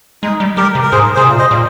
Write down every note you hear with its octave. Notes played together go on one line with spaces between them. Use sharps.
G#3 D#4
G3
G3 G4 A#4
C3
A#4
G#2 G#4 C5
C3 G#4 C5
A#2
C5 D#5
A#2